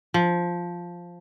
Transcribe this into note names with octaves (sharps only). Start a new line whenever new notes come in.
F3